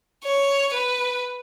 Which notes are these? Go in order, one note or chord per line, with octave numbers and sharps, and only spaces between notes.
C#5
B4